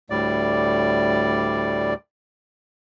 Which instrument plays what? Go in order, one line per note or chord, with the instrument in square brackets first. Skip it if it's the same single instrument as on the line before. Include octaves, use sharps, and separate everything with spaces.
[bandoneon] D2 A2 G3 D5